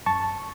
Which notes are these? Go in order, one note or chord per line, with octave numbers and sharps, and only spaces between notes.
F#2 A5 C#6